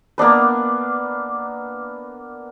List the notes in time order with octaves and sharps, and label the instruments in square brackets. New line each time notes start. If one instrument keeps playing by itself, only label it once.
[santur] A#3 B3 D4 B4